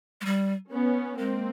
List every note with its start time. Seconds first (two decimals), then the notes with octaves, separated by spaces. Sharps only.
0.21 G#3
0.25 G3
0.72 B3 C#4
1.19 G#3 A#3 C4